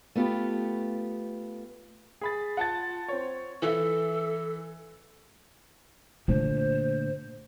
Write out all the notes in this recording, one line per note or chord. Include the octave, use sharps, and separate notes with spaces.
A3 B3 F4 G4
G#4 B5 A6
F4 F#5 A5 A6
C4 C#5
E3 A4 E5
A#2 D3 A3 D4 C5